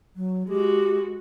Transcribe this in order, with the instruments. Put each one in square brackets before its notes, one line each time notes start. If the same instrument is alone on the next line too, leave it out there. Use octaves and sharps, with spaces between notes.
[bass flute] F#3
[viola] G#3 F#4 [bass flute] G4